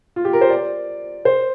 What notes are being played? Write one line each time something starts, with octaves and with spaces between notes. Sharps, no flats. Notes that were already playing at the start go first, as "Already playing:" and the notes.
F4
G4
A#4
C5
D5
C5